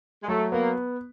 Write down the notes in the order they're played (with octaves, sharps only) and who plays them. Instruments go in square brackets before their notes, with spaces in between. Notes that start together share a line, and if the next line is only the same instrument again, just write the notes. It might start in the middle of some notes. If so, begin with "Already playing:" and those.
[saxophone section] G#3
[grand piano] F#3 [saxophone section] A3
[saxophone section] A#3 [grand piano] B3